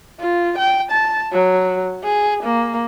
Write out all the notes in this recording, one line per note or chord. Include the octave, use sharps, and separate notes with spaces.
F4
G5
A5
F#3
G#4
A#3